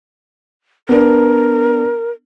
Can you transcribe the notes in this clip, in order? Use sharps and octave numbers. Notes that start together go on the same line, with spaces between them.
B3 D4 A#4